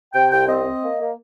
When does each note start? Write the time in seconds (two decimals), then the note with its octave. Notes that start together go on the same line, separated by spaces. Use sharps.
0.13 C3 G5
0.31 C2 G5
0.48 C4 D#5
0.65 C4
0.83 A#3
1.01 A#3